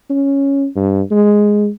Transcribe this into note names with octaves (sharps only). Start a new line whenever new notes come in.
C#4
G2
G#3